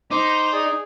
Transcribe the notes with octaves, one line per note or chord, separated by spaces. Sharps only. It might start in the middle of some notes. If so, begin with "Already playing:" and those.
D#4 C5 D6
G#4 D5